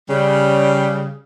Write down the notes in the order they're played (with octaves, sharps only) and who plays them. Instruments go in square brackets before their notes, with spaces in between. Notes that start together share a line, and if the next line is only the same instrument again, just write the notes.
[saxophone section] C#3 G3